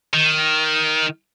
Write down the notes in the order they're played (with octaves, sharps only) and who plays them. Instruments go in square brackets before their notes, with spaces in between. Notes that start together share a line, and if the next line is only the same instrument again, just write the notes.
[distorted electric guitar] D#3